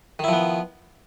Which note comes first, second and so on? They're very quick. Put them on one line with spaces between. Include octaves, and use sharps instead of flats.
D#3 E4 F3 B3